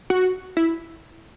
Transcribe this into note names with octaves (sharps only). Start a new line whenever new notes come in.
F#4
E4